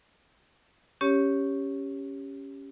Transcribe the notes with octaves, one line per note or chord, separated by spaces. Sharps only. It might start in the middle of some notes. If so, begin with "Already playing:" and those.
C#4 G4 C#5